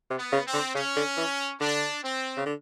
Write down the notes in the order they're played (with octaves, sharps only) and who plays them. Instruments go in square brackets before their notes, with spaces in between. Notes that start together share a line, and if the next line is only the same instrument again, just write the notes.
[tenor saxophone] C3
[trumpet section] B3
[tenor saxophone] C#3
[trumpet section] C4
[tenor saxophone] D3
[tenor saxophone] C#3 [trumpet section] C#4
[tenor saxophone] D3
E3
[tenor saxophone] D3 [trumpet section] D4
[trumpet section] C4
[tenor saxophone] C#3
D3